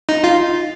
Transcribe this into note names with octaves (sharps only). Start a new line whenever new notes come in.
D#4
F4